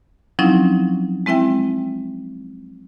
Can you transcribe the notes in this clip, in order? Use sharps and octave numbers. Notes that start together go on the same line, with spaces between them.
F3 F#3 C4 C#4 D#4 E4
G#3 C4 E4 E5 G5